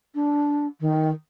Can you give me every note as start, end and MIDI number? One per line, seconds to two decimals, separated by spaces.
0.15 0.67 62
0.80 1.10 51